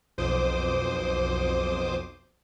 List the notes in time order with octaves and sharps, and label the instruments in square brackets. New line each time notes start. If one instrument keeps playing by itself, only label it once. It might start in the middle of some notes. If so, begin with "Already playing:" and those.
[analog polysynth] B1 F2 C5 D6 D#6